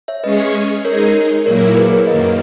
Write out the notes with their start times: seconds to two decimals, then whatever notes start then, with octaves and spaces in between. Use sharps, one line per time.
0.08 C#5 E5
0.24 G#3 C#4 G#4 B4 C#5 D#5
0.85 G#3 D#4 G#4 A#4 C#5
1.46 A#2 F#3 A#3 E4 A#4 C#5
1.77 G#4 B4
1.92 A#4 C#5
2.07 F#2 D#3 A#3 B4 D#5